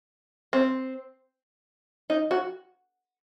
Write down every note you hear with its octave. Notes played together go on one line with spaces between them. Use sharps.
C4
D#4
F#4